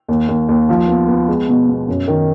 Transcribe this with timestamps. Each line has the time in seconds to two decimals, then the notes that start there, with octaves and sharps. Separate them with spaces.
0.08 D#2
0.28 D#2
0.49 D#2
0.69 F3
0.88 B3
1.08 B3
1.28 G#3
1.49 B2
1.68 B2
1.88 F#2
2.08 D#3